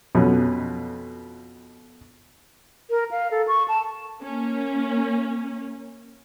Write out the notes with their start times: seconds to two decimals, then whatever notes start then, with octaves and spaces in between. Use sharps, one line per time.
0.15 F2 B2 C#4
2.90 A#4
3.11 F5
3.31 A4
3.48 C#6
3.68 A5
4.22 A#3 C#4